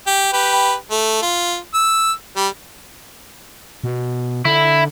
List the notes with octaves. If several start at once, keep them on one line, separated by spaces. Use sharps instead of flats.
G4
G4 B4
A3
F4
E6
G3
B2
D3 E4